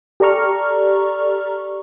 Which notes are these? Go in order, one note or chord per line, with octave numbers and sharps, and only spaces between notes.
G4 A4 D5 A#5 C#6 F6